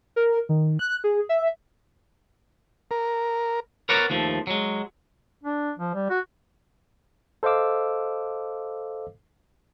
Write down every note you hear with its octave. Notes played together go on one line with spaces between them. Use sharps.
A#4
D#3
F#6
G#4
E5
A#4
A#4 B4 C#5 D5 F#5 A#5
D#2 F3 A3
F#3 G#3
D4
F3
G3
F#4
A4 C5 D#5 F5 D6 E6